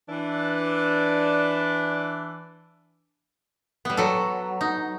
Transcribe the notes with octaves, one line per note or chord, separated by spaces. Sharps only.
E3 D4
G3 B3
F#3 A4
D#4